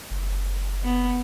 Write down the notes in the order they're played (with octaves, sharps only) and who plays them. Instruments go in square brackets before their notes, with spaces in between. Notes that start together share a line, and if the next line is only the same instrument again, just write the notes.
[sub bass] F#1
[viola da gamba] B3